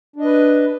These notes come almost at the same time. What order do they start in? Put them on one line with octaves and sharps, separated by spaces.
D4 D#5 B4